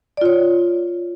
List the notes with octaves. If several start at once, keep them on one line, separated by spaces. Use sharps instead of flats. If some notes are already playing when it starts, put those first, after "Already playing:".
F4 C#5 D5